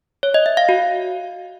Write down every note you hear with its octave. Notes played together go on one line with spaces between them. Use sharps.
C#5
D#5
E5
F5
F#4